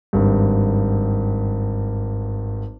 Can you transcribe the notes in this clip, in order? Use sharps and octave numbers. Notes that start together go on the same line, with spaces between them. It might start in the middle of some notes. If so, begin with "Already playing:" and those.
G#1 G2